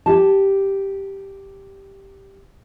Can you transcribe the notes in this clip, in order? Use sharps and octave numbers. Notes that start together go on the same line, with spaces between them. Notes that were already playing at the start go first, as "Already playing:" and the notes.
G4 A5